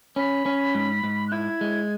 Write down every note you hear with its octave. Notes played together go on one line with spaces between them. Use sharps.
C#4 B5
C#4
G#2
G#2
F#6
E4 G#6
G#3